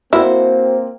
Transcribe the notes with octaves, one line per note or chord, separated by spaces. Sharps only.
A#3 C4 E4 F#4 C5